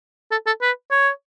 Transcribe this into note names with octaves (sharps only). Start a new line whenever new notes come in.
A4
A4
B4
C#5